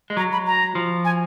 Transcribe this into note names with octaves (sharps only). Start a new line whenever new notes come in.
G#3
F#3 A#5
B5
A#5
F3
G#5